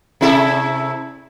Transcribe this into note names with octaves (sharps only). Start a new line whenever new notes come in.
C3 E4 A4